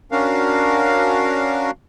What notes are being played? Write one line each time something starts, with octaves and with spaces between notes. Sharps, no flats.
C#4 D4 F#4 A#4 F5